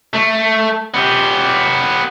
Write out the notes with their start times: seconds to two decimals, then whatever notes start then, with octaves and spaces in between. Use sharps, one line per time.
0.13 A3
0.94 B3 G4